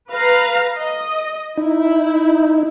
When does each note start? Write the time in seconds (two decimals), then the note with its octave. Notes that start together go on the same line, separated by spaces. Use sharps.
0.11 B4 F5 A#5
0.79 D#5
1.57 D#4 E4